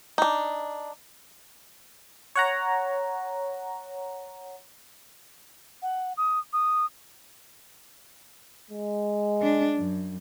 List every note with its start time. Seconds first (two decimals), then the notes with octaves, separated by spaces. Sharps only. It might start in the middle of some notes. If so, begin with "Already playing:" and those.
0.18 D4 D#4
2.35 C#5 F#5 A#5
5.82 F#5
6.17 D#6
6.53 D#6
8.71 G#3
9.42 D4
9.77 F#2